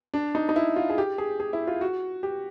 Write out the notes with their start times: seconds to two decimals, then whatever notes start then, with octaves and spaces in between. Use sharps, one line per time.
0.14 D4
0.35 D#4
0.49 D#4
0.56 E4
0.76 F4
0.90 G#4
0.98 G4
1.18 G#4
1.40 G#4
1.53 E4
1.67 F4
1.81 F#4
2.23 G4